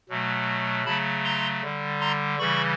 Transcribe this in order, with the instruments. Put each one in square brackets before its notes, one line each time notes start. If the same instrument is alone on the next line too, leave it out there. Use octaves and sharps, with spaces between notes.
[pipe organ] B2 F#3 A3
C#3 F#3 A3 A5 B5
A#5 C6
D3 G3
A#5 C6
C#3 E3 G3 B5 C#6